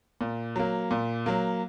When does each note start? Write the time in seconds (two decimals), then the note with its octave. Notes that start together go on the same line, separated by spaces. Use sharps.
0.21 A#2
0.56 F#3 A#3
0.91 A#2
1.26 F#3 A#3